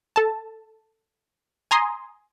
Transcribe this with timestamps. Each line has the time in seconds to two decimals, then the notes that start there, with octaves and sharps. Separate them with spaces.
0.16 A4 A5
1.71 G#5 A#5 C6 D#6